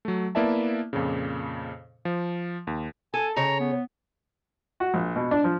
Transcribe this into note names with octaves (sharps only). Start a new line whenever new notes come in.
F#3 A3
A#3 B3 E4 D5 E5 A5
F2 A#2 C#3
F3
D#2
A4 G#5
C#3 C#5 A#5
B3
F#4
A#1
B2
D4
F3